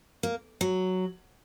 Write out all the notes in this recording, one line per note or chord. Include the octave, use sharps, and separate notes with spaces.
A#3
F#3